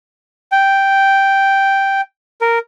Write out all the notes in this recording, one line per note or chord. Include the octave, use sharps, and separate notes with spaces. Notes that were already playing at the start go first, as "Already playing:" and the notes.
G5
A#4